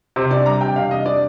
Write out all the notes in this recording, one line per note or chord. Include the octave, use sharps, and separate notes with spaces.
C3 C5
D4 D5
G3 A#5
C3 G5
C3 F5
D4 D#5
D4 D5